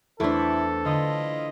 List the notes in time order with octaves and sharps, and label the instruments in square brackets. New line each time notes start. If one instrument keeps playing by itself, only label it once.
[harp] E2 C5 [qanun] A3 D4 [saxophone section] E4 [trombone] A4
[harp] D3 [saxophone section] E4 F4 D#5